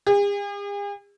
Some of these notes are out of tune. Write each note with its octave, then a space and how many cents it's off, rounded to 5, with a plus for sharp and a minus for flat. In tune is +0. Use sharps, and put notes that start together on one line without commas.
G#4 -45